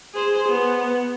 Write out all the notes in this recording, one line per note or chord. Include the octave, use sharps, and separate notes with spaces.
G#4 C5
B3